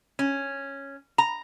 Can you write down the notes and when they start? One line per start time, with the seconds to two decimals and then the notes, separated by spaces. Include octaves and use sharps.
0.19 C#4
1.18 A#5